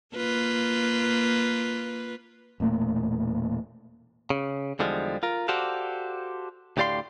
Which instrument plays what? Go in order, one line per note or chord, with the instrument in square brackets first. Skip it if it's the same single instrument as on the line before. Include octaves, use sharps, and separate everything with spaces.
[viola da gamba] A#3 F4 B4
[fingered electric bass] E1 A#2 A3 A#3
[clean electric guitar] C#3
E2 D3 F3 G3 G#3
F4 A#4
F#4 G4 A4 C5 D5 F5
D2 A2 G4 D5 F5 C6